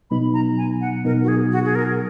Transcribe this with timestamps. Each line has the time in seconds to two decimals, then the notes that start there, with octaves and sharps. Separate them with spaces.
0.10 B2 F#3 B3 D#4 B5
0.34 A#5
0.58 G#5
0.81 F#5
1.05 B2 F#3 B3 D#4 A#4
1.23 F#4
1.28 G#4
1.52 F#4
1.65 G#4
1.75 A#4